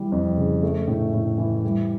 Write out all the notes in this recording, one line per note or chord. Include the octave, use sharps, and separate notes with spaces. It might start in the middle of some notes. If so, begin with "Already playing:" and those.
Already playing: E3 G3
F2
C#3
A3
A2
A2
E3
G3